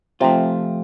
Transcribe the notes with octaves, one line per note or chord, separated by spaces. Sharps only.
C3 F3 A3 C4 F4